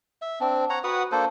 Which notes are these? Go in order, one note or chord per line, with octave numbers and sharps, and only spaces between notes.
E5
C4 D4
C#5 F#5 A#5
F#4 B4 F#5 D#6
A#3 D4 A4 C5